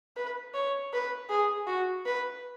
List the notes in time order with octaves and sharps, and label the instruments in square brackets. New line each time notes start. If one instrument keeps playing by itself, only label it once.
[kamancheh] B4
C#5
B4
G#4
F#4
B4